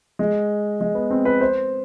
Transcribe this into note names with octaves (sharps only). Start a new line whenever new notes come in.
G#3
G#3
B3
C4
B4
C5